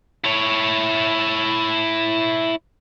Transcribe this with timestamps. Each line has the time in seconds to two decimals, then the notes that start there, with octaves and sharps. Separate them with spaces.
0.24 E4 C#5